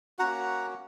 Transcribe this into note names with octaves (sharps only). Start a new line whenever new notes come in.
A#3 C#4 F#4 F#5 A#5